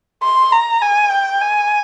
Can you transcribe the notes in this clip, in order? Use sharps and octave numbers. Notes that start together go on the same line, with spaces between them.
C6
A#5
G#5
G5
G#5